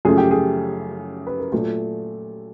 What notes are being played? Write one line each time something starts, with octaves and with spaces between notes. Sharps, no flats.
F#2 C#3 F3 A3 G#4
G4
G#4
B4
A#4
A#2 F#3 A3 A4